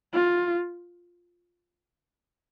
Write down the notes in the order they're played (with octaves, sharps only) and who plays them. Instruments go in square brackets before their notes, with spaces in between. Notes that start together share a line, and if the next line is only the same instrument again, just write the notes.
[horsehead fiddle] F4